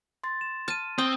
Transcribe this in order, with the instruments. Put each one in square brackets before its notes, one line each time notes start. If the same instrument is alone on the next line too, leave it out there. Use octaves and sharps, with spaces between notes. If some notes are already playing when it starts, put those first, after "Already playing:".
[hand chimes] C6 A6
[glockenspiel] E7
[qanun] A5 [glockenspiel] F6 D#7
[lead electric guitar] C4 [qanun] G5 [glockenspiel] D#6